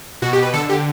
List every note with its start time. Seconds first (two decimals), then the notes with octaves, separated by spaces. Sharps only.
0.22 B2 F#4
0.33 G4
0.37 B2
0.42 B4
0.53 D3 A4
0.69 D3 G4